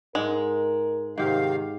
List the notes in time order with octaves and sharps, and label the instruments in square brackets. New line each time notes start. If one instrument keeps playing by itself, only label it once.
[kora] G#2 [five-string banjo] G#3 [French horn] A#4
[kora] G#2 G4 [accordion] C3 D#3 F5